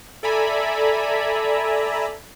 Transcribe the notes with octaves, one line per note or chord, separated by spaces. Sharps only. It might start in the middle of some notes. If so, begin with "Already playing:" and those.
A4 D5 E5 G#5 A#5 B5